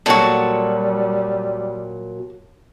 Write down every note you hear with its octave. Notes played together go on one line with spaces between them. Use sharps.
A#2 F#3 G3 F#4 A4